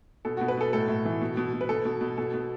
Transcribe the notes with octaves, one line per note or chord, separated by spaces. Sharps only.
B2 A4
F#4
B2
B4
B2 A4
A2 A4
A2
E3
B2
B2
B2
B4
B2 A4
B2
B2
B2 A4
B2